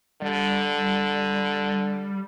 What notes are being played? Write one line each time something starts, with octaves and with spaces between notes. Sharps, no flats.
D3 G3